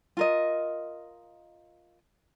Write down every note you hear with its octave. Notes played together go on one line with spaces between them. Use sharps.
F4 A#4 D#5